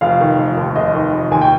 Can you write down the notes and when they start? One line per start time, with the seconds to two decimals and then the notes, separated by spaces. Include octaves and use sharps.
0.01 F1 F5
0.21 D#3
0.38 F1
0.57 D#2
0.76 F1 D#5
0.94 D#3
1.13 F1
1.31 D#2 G#5
1.41 G5